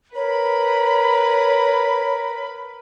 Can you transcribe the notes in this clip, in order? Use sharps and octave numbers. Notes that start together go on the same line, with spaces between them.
A#4 B4 C#5 B5